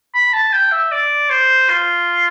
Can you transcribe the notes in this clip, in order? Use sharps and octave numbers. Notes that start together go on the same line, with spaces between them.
B5
A5
G5
E5
D5
C5
F4